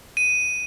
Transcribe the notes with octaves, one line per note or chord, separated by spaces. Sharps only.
D#7